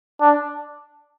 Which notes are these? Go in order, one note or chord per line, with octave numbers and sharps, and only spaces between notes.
D4